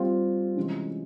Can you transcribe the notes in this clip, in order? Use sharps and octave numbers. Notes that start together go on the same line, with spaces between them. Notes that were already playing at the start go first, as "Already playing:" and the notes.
Already playing: G3 C4 F4
C3 E3 G#3 C#4